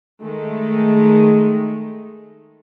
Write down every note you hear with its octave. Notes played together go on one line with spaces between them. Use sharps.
D#3 G#3 A3